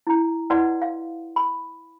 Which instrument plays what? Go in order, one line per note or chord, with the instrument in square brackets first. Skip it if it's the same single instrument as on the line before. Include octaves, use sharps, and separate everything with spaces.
[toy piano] E4 A#5
E4 B4 D5 D#5 F#5 C6
F5
B5